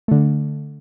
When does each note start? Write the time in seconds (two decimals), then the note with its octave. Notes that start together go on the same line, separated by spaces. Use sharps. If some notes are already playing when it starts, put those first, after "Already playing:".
0.08 D3 A3